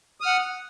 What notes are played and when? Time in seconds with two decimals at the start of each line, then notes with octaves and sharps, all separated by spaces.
0.21 D#6
0.23 F6
0.26 F#5